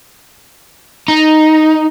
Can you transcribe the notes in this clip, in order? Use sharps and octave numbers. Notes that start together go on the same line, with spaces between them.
D#4